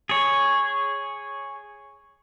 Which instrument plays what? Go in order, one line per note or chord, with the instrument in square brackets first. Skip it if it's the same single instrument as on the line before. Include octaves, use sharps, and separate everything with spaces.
[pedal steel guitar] G#4 C#5